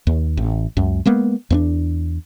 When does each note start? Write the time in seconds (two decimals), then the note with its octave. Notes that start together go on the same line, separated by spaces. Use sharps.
0.07 D#2
0.37 A1
0.77 C#2 F#2
1.06 G#3 A#3 B3
1.50 E2 B3 D4